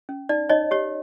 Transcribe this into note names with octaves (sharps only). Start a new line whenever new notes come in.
C#4
D#4 D5
D#4 C#5 D#5
G4 C#5